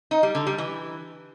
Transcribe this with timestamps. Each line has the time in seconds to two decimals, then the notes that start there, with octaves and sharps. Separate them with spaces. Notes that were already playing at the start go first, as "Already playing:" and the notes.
0.11 D#4
0.23 G3
0.35 D3
0.47 G3
0.58 E3